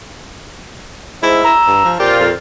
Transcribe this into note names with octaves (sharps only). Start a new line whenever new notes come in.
G#2 E4 E6
A#5 E6
G2
F3
A#2 C4 F4 G4
F2